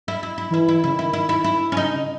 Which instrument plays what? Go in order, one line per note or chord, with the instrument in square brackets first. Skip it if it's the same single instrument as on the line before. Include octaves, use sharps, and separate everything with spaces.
[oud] E4
E4
E4
[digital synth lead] E3 [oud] E4
[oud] E4
[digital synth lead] C#3 [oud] E4
[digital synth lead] D#3
[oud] E4
E4
E4
E4
C#4
[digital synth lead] C#3 [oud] D#4
[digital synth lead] C#3